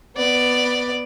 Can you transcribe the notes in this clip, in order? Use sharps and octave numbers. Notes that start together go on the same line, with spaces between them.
B3 D5